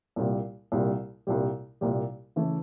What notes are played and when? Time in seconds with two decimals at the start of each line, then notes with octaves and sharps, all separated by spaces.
0.16 C2 A#2 G3
0.72 C2 A#2 G3
1.27 C2 A#2 G3
1.81 C2 A#2 G3
2.36 C#3 E3 A3